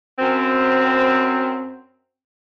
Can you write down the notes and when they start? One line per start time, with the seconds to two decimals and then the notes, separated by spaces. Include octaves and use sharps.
0.19 F#2 C4